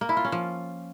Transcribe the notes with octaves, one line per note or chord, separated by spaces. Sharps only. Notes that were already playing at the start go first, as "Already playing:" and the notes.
A#3
E4
F4
C#4
F3